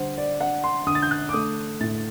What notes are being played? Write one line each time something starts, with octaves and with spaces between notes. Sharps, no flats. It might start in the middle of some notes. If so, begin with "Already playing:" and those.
Already playing: D3 G3 C5 F#5
D5
D4 F#5
C6
D3 D#6
A6
G6
F#6
D6
A3 D#6
A2 A6